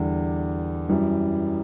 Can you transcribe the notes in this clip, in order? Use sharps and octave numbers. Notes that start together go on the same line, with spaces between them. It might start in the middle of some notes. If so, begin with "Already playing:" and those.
Already playing: E2 D3 G3 D4
F#2 E3 G3